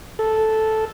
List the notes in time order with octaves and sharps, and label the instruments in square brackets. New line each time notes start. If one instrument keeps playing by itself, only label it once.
[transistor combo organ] A4